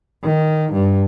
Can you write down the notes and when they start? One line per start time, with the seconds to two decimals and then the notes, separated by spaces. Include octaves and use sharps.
0.24 D#3
0.73 G2